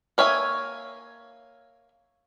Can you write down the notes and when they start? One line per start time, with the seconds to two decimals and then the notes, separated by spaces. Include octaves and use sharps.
0.18 A#3 C#5 E5 G#5